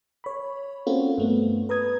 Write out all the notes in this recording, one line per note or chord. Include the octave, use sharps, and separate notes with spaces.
C#5 B5
A#3 C4 C#4 F4 F#4 A4
G2 A3 B3
B4 A#5 D#6 G#6